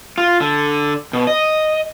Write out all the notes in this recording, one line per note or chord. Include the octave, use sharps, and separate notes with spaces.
F4
D3
B2
D#5